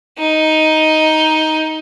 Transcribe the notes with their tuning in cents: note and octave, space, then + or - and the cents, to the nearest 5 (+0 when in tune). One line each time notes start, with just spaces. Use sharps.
D#4 +10